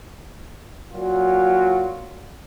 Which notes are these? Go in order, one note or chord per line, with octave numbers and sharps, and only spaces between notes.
A#2 F#3 F4